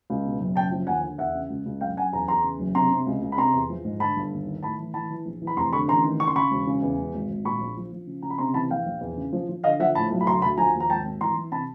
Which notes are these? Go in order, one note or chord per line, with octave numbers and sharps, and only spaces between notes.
C#2
B2
F#1
C#3 G5 A5
F3
D#2 F#5 G#5
D3
E2 E5 F#5
C#3
C#2
C#2
F#2 F5 G5
F#2 F#5 G#5
E2 G#5 A#5
E2 A#5 C6
C#3
F#1
C3 A#5 C6
C3
C#2
C#2
B5
C3 A#5 C6
E2
F3
G#2
D3 A5 B5
G1
D#2
D#3
A2 A5 B5
E3
E3 A5 B5
E3
A#1
E3
B5
F1 A#5 C6
D3 B5 C#6
A1 A#5 C6
D#3
C#3 C#6
C6
C#3 B5 C#6
E1
C#3
E2
E1
G#1
G#1
A#2 B5 C#6
A#1
F3
F3
C#3
C#3 A#5
B5
C3 A#5 C6
E3 A5 B5
A#1 F5 G5
A#1
E2
C#3
F3
F3
D3 D#5 F5
F3 E5 F#5
A2 A5 B5
B1
B5
D2 A#5 C6
D2 A5 B5
F3 G#5 A#5
D#2
A#5
G#1 G5 A5
G#1
E3 A#5 C6
E3
C3 A5 B5